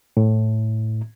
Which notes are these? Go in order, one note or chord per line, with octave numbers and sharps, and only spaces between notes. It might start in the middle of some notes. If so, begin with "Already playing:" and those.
A2